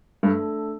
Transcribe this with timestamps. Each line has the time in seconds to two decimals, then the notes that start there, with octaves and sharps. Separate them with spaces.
0.23 G2 A3 D4 A4